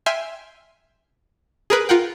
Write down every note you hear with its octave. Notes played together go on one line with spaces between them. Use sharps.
E5 G5 G#5 C6 F6
G#4 A#4 B4
F4 A#4 F#5 G5